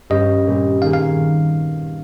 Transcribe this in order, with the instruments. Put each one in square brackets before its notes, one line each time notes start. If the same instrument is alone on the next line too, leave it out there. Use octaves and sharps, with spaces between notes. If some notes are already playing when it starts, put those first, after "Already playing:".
[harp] G2 G3 C#4 G4 [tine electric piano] D#5
[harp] A#2 G3 C4
[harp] D#3 A#3 D#4 G#4 [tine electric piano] F5
[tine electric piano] F5